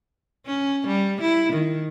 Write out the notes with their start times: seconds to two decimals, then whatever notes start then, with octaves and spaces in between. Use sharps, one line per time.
0.46 C#4
0.87 G3
1.21 E4
1.53 D#3